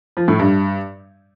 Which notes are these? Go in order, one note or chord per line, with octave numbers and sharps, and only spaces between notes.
F3
A2
G2